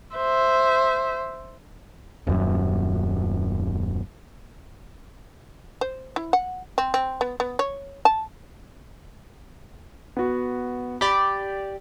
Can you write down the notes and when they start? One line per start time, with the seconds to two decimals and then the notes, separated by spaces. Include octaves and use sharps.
0.16 C5 E5
2.27 D#1 F#2
5.81 C5
6.16 E4
6.33 F#5
6.78 C4
6.94 C4
7.21 B3
7.40 B3
7.59 C#5
8.05 A5
10.17 B3 F#4
11.01 G4 D5 B5